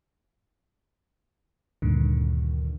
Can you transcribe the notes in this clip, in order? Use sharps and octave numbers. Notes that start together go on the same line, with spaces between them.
D2 G2 A#2 D3 D#3